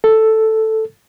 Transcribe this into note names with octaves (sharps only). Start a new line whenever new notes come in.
A4